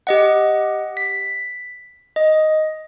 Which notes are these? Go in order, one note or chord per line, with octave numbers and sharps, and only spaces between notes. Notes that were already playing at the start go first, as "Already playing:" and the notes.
G4 D#5 F#5
B6
D#5